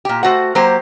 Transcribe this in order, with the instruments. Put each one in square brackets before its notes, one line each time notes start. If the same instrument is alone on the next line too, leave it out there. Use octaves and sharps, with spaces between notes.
[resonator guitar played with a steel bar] A#2 G4
A3 F#4 C5 F#5
F#3 A#3 G4 C5